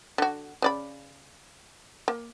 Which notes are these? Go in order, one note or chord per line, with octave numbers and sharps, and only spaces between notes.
D3 F#4
C#3 D5 B5
A#3